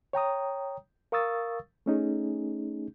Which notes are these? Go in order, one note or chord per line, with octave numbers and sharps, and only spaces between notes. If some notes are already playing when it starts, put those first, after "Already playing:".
C#5 G5 A#5 D#6
A#4 F5 C#6 D#6 E6 A6
A3 C#4 D#4 G#4